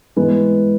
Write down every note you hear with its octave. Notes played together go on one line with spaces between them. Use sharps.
G#2 E3 G#3 B3